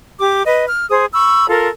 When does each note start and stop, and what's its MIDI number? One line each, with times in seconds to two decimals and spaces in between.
0.20 0.42 67
0.20 0.42 86
0.45 0.65 71
0.45 0.65 75
0.67 0.89 89
0.90 1.05 68
0.90 1.05 72
0.90 1.05 87
1.12 1.49 83
1.12 1.49 85
1.12 1.49 88
1.50 1.68 65
1.50 1.68 69
1.50 1.68 70